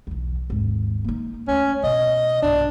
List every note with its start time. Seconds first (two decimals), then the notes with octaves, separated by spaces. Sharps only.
0.07 B1 E2
0.50 G#1 D#2
1.04 A#3 D#4
1.48 D2 A3 C#4
1.84 B2 D#5
2.42 B1 G2 D4